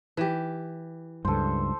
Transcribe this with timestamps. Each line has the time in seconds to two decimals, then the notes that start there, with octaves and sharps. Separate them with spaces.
0.17 E3 G4
1.25 C#2 G2 A4 C5